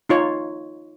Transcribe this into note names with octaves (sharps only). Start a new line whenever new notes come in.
D#4 F4 C#5